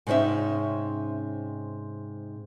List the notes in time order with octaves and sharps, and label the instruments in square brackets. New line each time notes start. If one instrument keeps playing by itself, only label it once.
[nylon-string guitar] G#2 C3 C#4 D#4 E5